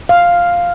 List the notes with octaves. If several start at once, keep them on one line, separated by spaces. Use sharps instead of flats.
F5